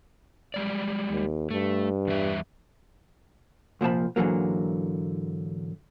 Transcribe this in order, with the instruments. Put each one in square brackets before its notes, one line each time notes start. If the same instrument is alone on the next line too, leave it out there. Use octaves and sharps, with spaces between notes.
[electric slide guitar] G3 G#3 D5
[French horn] D#2
[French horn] G2 [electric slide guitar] A3
[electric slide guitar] E2 G3 E5
[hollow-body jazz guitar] C2 A#2 F3 A5 B5
G#2 D3 E3 F#3 A#3